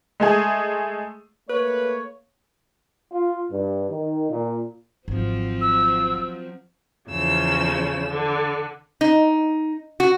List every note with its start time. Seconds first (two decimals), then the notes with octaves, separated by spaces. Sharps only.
0.20 G#3 A3 G#4
1.49 A3 A#3 B4 C#5
3.11 F4
3.50 G2
3.90 D#3
4.29 A#2
5.08 G#1 F3 F#3 C4
5.61 E6
7.10 E2 C#3 F3 E6
8.09 D3
9.01 D#4
10.00 F#4